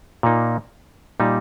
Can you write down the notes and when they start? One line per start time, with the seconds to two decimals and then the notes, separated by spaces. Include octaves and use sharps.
0.23 A#2 A#3 D#4
1.20 A#2 G3 D#4